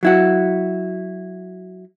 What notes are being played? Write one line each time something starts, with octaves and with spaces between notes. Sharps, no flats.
F#3 E4 F#4